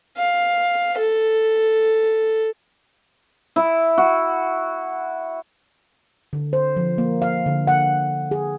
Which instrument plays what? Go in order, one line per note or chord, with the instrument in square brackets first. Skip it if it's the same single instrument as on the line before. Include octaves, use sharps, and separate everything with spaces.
[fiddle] F5
A4
[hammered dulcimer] E4
F#4
[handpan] D3
C5
F3
A#3
F5
D3
F#5
G#4